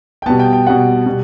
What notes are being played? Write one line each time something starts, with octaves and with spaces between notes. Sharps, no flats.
G5
B2 G3 B3 A5
G5
G5
B2 G3 B3 F#5
B2 G3